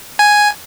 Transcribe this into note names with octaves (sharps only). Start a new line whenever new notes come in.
G#5